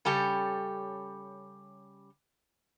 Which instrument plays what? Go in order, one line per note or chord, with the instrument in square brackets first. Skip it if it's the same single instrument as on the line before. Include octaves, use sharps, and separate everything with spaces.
[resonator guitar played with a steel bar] C#3 G3 C#4 G4 A4